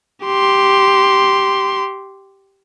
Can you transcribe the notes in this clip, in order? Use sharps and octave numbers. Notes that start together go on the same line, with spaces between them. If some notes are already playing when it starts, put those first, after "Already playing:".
G4 C6